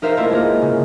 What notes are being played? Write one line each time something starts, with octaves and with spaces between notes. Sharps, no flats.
D#4 A#4 C5 E5 F5
A3 A#3 E4 F4 A#4
G#3 A#3 A#4
C#3